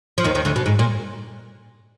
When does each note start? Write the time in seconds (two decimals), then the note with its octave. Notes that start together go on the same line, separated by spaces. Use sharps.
0.18 F3
0.24 D#2 D#3
0.35 D#2 D#3
0.45 D2 D3
0.56 B2
0.66 G#2
0.79 A#2